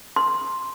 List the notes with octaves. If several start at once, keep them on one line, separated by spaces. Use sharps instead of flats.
C6